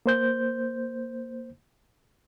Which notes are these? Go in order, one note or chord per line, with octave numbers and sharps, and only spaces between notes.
A#3 C5 G6